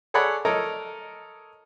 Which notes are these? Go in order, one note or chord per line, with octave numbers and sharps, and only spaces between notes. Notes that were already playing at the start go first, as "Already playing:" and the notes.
G#4 A4 C#5 D5 F#5 B5
A4 A#4 C#5 D#5